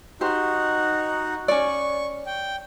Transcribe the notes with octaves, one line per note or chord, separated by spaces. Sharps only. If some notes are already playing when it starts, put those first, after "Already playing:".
D#4 F#4 G4 C5
C#4 D5 C#6
G5